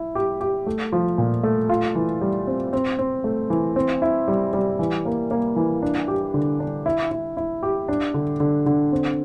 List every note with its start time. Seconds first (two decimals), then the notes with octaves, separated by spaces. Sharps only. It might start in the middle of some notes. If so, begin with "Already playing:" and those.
Already playing: E4
0.15 G4
0.41 G4
0.66 A3
0.92 F3
1.18 A#2
1.43 A3
1.69 F4
1.95 E3
2.21 G3
2.47 C4
2.73 C4
2.99 C4
3.24 A3
3.50 E3
3.76 C4
4.02 E4
4.28 G3
4.53 G3
4.79 E3
5.05 A#3
5.31 A#3
5.56 E3
5.82 D4
6.08 G4
6.34 D3
6.60 D4
6.86 E4
7.11 E4
7.37 E4
7.63 G4
7.88 D4
8.14 D3
8.40 D3
8.66 D3
8.92 C4